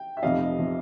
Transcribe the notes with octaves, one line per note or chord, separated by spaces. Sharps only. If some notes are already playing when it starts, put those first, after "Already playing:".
Already playing: G5
E5
F1 F2 C3 F3 D#5 F5
C3 F3